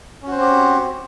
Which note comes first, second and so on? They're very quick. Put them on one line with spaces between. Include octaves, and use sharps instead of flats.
C#4 F#4 C5 C4 G4